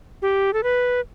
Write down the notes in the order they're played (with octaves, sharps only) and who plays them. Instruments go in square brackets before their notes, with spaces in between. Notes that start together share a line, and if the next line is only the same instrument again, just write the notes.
[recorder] G4
A4
B4